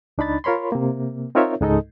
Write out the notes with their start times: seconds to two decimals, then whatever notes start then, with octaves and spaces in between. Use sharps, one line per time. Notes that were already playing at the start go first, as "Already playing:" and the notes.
0.18 C#2 D4 D#4 B5 A6
0.44 F4 A#4 C#5 B5 C6
0.72 C3 A#3
1.35 C4 D#4 F4 A#4 C#5 E5
1.60 C#2 G#2 G#3 D#4 A4 D#5